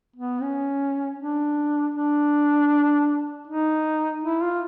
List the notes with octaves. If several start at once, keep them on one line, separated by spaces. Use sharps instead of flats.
B3
C#4
D4
D4
D#4
E4
F4